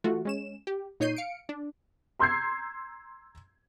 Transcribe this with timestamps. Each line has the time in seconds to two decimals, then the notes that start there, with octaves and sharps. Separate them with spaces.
0.04 E3 A3 F4 F#4
0.25 G#3 C#4 E7
0.67 G4
1.00 A#2 D#4 C#5 G6 C7 D#7
1.16 F5 C#7 D7
1.49 D4
2.19 A#5 C6 E6 G6 G#6 C7